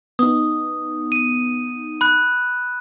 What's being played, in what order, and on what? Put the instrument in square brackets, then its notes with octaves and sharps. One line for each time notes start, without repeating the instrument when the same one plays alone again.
[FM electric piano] B3 D#4 [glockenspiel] D#6
[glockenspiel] D#7
B5 F#6